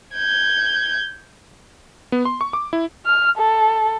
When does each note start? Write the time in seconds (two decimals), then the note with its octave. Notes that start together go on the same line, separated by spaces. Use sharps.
0.14 G6 G#6
2.12 B3
2.25 C6
2.41 C#6
2.53 D6
2.73 E4
3.06 F6
3.38 A4